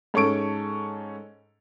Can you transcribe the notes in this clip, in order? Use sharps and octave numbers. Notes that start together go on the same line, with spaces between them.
G#2 C#4 A4 C#6 D7